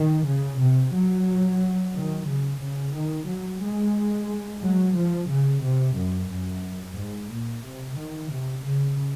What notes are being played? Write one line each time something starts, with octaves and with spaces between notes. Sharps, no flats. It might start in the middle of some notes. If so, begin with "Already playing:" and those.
Already playing: D#3
C#3
C3
F#3
D#3
C#3
C#3
D#3
F#3
G#3
F#3
F3
C#3
C3
F#2
F#2
G#2
A#2
C3
D#3
C3
C#3